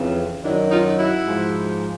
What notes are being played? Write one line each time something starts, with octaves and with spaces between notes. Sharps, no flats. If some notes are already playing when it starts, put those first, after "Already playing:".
Already playing: F2 C#3 E3
F#2 D#3 F#3 D4 E4
D#4 F4
E4 F#4
G#2 F3